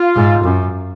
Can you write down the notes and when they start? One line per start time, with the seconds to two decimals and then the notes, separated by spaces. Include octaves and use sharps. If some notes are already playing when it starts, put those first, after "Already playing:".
Already playing: F4
0.15 G#2
0.44 F#2